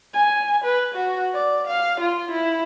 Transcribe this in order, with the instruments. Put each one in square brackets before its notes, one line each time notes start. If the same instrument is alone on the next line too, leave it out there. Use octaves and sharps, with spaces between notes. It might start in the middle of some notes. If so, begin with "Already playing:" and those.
[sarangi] G#5
B4
F#4
D5
F5
F4
E4